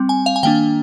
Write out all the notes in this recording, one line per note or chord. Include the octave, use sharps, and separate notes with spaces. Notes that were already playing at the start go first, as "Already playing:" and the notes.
Already playing: G3 C4
G#5
F5
G#5
D#3 A#3 D4 G5